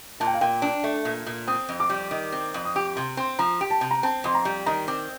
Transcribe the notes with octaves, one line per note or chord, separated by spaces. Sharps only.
A#2 A5
G5
F5
A#2 G5
D4
A3
A#2
A#2
C4 D#6
F2
D6
G3
D#3
C4
F2
D#6
G4 D6
C3 C6
C4 C6
F3 A#5
G4
A5
C3
A#5
C4 A5
F2 C6
A#5
G3
D#3 A#5
C4 D6